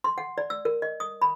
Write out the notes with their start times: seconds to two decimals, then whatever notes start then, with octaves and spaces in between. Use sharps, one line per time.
0.04 C6
0.18 F#5
0.38 D5
0.50 E6
0.65 A#4
0.82 D#5
1.00 D#6
1.22 B5